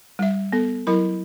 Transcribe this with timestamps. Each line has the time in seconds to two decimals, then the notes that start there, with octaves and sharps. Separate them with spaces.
0.19 G3 E5
0.52 B3 A4
0.87 F#3 E4 A#4 B5